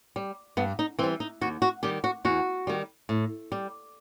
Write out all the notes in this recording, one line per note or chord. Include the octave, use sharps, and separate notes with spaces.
G3
G2 B3
D#4
E3 G3 C4
D#4
D#2 F#4
F#4
D#3 G3 G4
F#4
E2 F#4
D#3 G3
A2
G3